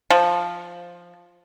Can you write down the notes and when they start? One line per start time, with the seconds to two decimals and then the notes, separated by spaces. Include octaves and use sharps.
0.10 F3